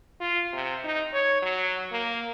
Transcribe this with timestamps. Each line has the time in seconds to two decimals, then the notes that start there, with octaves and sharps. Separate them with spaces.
0.20 F4
0.53 C3
0.84 D#4
1.13 C#5
1.42 F#3
1.92 A#3